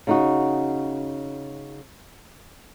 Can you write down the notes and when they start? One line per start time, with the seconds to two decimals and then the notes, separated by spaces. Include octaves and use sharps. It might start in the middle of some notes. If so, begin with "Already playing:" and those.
0.07 C#3 D#4 F#4